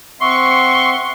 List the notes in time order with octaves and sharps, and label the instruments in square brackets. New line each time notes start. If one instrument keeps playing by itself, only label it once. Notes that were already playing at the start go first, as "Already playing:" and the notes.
[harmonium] C4 E5 F#5 [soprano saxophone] C6 [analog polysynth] C#6